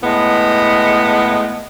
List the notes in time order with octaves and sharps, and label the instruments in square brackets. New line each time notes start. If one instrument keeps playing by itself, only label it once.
[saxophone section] A2 G#3 B3